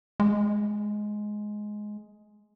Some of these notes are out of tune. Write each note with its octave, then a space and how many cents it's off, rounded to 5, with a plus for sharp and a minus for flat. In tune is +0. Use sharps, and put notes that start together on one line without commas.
G#3 +10